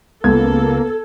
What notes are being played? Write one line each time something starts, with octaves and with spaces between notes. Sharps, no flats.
C#2 A#3 B3 A4 G#6